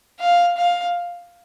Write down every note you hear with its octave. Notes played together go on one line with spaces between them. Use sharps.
F5
F5